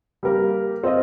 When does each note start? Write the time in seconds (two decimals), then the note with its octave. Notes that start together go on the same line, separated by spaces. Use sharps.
0.23 G3 A#3 G4 A#4
0.84 C4 F4 D#5